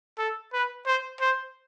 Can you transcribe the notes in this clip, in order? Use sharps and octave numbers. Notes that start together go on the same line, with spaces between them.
A4
B4
C5
C5